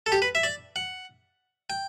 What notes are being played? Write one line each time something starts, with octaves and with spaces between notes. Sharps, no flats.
A4
G4
B4
E5
D5
F#5
G5